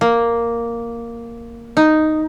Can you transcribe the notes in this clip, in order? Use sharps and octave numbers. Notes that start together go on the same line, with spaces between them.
A#3
D#4